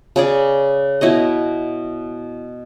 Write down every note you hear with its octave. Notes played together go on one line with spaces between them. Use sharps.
C#3 G#4 D5
B2 E4 C#5 D#5